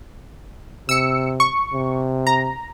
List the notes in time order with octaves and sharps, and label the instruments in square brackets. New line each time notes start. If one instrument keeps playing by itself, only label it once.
[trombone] C3 [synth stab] E6 C#7
[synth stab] C#6
[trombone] C3
[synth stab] A#5